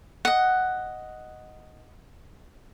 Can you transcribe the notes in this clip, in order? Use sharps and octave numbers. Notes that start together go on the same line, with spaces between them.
D#5 F#5